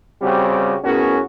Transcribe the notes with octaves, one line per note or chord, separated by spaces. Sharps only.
C#3 G3 C4 F#4 G4
A2 B3 C#4 F#4 G#4 A#4